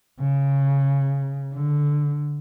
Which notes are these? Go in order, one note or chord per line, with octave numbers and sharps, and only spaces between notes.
C#3
D3